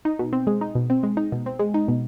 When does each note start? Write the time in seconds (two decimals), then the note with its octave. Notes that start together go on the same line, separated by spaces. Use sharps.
0.05 D#4
0.19 B2
0.33 C4
0.47 G#3
0.61 D#4
0.75 B2
0.90 C4
1.03 G#3
1.17 D#4
1.32 B2
1.46 C4
1.59 G#3
1.74 D#4
1.88 B2